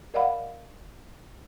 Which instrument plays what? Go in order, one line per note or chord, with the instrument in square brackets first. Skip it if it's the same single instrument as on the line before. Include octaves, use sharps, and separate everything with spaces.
[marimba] A#4 D5 D#5 F5 F#5 B5